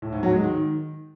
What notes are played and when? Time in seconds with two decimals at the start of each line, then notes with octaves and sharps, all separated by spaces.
0.02 A2
0.13 G#2
0.23 F#3
0.33 G#3
0.44 D#3